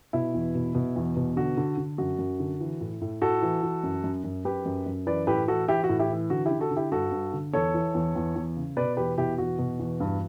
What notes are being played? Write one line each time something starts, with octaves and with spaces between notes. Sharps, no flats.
B2 E4
E2
B2
B2
E2
B2
D3 F#4
D3
D3
F#2 F#4
F#2
D3
E3
A2
A2
A2 F#4 A4
E3
E3
F#2
F#2
F#2
F#2 G4 B4
F#2
F#2
E3 B4 D5
A2 G4 B4
E3 F#4 A4
E3 E4 G4
F#4
A2
E4 G4
E3
D3 F#4
E4 G4
D3
F#4 A4
D3
E4 G4
G2 F#4 A4
G2
D3
E2 A4 C#5
E3
E2
E2
E2
C#3
B2 B4 D5
E2 G4 B4
B2 E4 G4
E2 F#4
B2
E2
G2